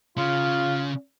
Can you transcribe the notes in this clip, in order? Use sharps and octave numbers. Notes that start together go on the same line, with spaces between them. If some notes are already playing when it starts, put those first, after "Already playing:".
C#3 F4